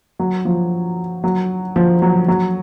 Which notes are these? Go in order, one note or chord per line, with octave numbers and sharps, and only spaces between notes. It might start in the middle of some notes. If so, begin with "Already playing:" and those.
F#3
F3
F#3
F3
F#3
F#3